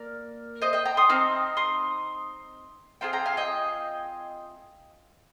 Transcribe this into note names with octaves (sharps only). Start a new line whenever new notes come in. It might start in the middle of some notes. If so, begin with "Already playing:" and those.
Already playing: A#3 A#4 D5
C5 D#5
D#5 G5
G5 A#5
C6 D#6
C4 D#4 F6
C6 D#6
C4 F4 G#4 G5 A#5
G5 A#5
F5 G#5
D#5 G5